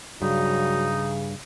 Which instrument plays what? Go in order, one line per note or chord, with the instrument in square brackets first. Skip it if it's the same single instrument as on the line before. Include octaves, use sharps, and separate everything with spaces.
[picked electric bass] G2 [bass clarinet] C#3 [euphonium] F#3 [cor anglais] D#4